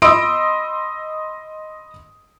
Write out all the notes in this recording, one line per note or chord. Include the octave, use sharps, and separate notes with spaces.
D#5 B5 C6 D#6 E6 D7